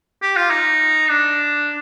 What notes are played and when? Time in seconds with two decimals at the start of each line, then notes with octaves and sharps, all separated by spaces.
0.22 G4
0.36 F4
0.50 D#4
1.10 D4